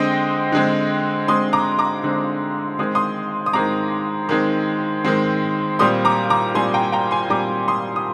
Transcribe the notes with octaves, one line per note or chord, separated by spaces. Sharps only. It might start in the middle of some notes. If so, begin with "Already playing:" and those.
Already playing: D3 G#3 C4 D#5 G5
D3 G#3 C4
D3 G#3 C4 C6 D#6
A#5 D6
A#5 D6
D3 G#3 C4
D#3 G#3 C4 D#6
C6 D#6
D#6
D#3 G#3 C4 A#5 D6
D#3 G#3 C4
D#3 G#3 C4
A#2 G3 C4 C6 D#6
A#5 D6
A#5 D6
A#2 G3 C4 G#5 C6
G5 A#5
G5 A#5
G#5 C6
A#2 G3 C4 A#5 D6
C6 D#6
D#6